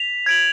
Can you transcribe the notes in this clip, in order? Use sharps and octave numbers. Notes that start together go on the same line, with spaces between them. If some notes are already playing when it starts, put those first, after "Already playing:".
Already playing: B6 F7
G#6 D7 F#7